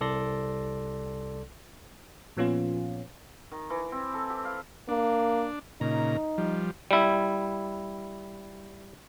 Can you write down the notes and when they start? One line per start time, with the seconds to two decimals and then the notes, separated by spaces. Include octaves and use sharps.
0.01 C2 A4 D5 C6 A#6
2.37 A#2 F3 B3 C#4 F4
3.52 D#3
3.70 E3
3.92 C4
4.14 A4
4.30 G4
4.45 F5
4.89 A#3 D4
5.81 A#2 C#3 D#4 A#5
6.38 F3 G3
6.91 G3 E4